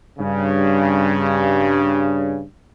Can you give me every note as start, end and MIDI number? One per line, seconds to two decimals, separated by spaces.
0.19 2.43 43
0.19 2.43 49